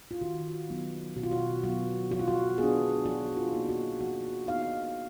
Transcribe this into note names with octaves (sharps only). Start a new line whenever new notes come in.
F4
D#3 F#4
F#3 B3 D#4
B2 F#4
F4
F#4
F#3 B3 F#4
F3 F#4
F4
F#4
B3 D4 G#4
F3 F#4
F4
A#3 D#4
F#4
F3 F#4
B3 D#4 F5